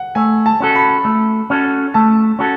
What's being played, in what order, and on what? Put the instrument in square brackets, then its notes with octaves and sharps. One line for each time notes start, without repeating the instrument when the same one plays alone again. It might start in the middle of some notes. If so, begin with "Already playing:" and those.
Already playing: [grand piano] F#5
[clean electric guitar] A3 [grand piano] G#5
[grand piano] A5
[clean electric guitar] C#4 F#4 A4
[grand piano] B5
[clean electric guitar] A3
C#4 F#4 A4
[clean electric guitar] A3 [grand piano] A5
[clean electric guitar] C#4 F#4 A4